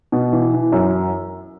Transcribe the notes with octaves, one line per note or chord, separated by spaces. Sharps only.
B2
E3
E3
F#2